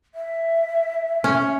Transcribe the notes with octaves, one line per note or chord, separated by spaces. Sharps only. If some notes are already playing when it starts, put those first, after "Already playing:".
E5
C#4